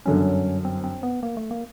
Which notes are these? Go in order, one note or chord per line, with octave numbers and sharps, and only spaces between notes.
G1 F#2 D3 C#4
C4
C4
B3
A#3
A3
A#3